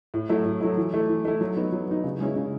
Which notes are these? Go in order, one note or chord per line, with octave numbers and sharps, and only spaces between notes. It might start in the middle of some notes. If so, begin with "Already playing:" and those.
A2
F#3 A3 E4
A2
F#3 A3 E4
E3
A3 E4
E3
A3 E4
F#3
B3 D#4
F#3
B3 D#4
C#3
G#3 C#4 E4
C#3